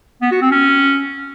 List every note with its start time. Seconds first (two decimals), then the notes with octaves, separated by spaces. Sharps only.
0.21 B3
0.31 F#4
0.41 C4
0.51 C#4